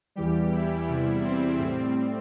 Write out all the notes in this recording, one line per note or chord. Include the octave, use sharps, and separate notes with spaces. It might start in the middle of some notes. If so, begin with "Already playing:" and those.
E2 E3 G3 G4
E4
E2 C3 G3
C4
A2 G3